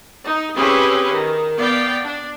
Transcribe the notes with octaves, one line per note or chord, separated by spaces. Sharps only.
D#4
C4 C#4 E4 G4 G#4 B4
D#3
B3 D5 F5 G5
D4